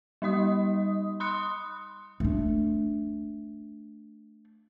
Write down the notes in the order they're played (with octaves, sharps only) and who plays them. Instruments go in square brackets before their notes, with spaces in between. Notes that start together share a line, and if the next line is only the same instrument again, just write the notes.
[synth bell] G3 D#4 D#5 D#6
B5 C6 D#6 F#6 C#7
[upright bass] A3 D4